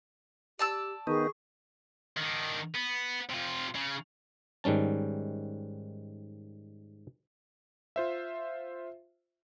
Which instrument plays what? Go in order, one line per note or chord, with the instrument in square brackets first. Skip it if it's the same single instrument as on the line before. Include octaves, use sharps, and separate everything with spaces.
[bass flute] G4 [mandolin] D5 A5 E6
[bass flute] D#3 [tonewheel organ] B3 D#4 [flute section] G#4 C#6
[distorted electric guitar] D#3 D4
B3
C3 F4
C#3
[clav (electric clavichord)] G#2 D#3 G3 C#4 A5
[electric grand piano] F4 C5 E5